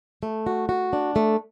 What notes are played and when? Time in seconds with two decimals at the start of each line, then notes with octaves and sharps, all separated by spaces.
0.23 A3
0.47 F#4
0.69 F#4
0.93 D4
1.16 A3